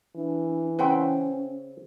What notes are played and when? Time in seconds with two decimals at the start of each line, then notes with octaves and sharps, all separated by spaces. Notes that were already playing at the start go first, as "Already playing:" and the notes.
0.16 E3 D4
0.79 C#3 C4 C#4 B4 E5 F#5 G5